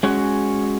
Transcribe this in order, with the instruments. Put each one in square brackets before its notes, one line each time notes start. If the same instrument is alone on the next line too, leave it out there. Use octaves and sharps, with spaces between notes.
[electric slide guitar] G#3 C#4 F#4